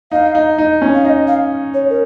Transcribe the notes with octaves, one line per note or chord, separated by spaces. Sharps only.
D#4 F5
D#4
D#4
C#4
F5
D#4 D#5
F5
C#5
A#4